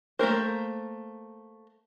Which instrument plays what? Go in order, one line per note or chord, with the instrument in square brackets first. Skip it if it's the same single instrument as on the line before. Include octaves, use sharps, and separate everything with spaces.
[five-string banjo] A3 A#3 A#4 C5